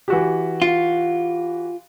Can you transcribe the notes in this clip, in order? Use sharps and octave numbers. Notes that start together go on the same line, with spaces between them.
E3 F#4 G4
F4